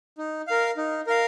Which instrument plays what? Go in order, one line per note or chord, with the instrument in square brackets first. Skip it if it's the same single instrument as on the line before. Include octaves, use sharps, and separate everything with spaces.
[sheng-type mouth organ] D#4
A#4 F5
D#4
A#4 F5